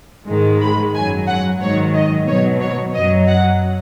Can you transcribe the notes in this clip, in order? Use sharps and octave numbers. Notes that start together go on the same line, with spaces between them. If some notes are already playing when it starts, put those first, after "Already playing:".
G#2 D#3 G#3
B5
F#2 F#3 G#5
F#5
G#2 D#3 F#3 C#5
D#5
B2 F#3 C#5
C#5
F#2 F#3 D#5
F#5